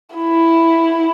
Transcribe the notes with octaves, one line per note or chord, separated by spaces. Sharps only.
E4